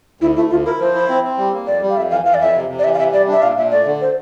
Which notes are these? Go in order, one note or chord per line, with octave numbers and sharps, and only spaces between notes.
D2 E4
A3 E4
D2 F4
E4 A#4
F3 C5
E4
C4
C4
G3
A#3
F2 D5
G3
F5
F2 E5
E3 F5
E3 F5
D5
F2 E5
C3
C3
D5
E3 E5
F5
C3 E5
G3 D5
D4 E5
A#2 F5
A#2 E5
A3 D5
D3
C5